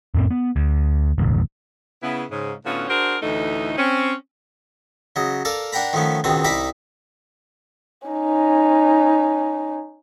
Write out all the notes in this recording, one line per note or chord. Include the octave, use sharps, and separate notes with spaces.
F2 A2 C4
B3
D2
E1 A1 D2
C#3 B3 E4
G#2 C#3
A2 D3 B3 C#4 F4 F#4
D4 F#4 G#4 A#4 C5
D2 A2 E3 A3 D#4
C4 C#4
C#3 F#3 D#5
A4 A#4 D5 F5
D4 A#4 F#5 G5 A#5 B5
D#3 F3 A3 B3 C#4
C#2 B2 D#3 C4 D#6
C2 D#4 D#5 E5 B5 D6
C#4 D#4